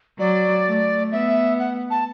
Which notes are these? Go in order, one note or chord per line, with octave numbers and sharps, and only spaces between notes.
F#3 D5
A3
B3 E5
F#5
A5